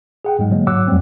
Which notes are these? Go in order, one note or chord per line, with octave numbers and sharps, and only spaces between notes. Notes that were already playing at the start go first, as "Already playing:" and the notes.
G#4 F#5 G5
G#2 F#3 G#3
D3 F#3 G#3 A#3
G#2 F#3 F#5 D6 E6 F#6
F2 F#3 G3 A3 C4